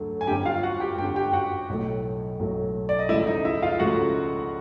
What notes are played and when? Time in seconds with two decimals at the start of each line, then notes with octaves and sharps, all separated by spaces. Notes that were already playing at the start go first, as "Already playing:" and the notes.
Already playing: D2 D3 F#3 A3
0.21 G#5
0.27 G1 F2 D3 G4 G5
0.45 F4 F5
0.63 F#4 F#5
0.80 G4 G5
0.98 G1 F2 D3 G4 G5
1.16 G4 G5
1.33 F#4 F#5
1.69 B1 A2 F#3 A3
2.39 B1 A2 F#3 A3
2.89 D5
2.99 D#5
3.09 C#2 C#3 F3 A3 E4 E5
3.27 D#4 D#5
3.45 E4 E5
3.62 F4 F5
3.79 C#2 C#3 F3 A3 F#4 F#5